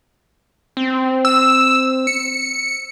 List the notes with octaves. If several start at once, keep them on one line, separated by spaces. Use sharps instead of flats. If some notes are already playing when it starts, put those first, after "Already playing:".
C4
E6
C#7